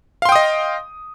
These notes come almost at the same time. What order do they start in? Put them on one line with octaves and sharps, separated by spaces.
F5 C6 G5 D#6 D#5